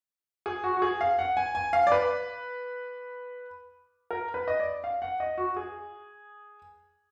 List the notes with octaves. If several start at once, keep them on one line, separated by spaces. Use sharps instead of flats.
G#4
F#4
F#4
G#4
F5
F#5
G#5
G#5
F5
D5
B4
A#4
B4
D#5
D5
F5
F#5
D#5
F#4
G#4